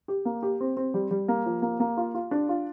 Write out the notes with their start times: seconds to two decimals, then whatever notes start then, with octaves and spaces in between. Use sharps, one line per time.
0.08 G4
0.25 A#3
0.43 G4
0.60 C4
0.77 C4
0.94 G3
1.11 G3
1.28 A#3
1.46 F3
1.62 A#3
1.80 A#3
1.97 F4
2.15 F4
2.31 D4
2.49 F4